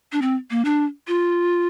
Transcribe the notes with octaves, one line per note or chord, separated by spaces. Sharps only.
D4
C4
A#3
D4
F4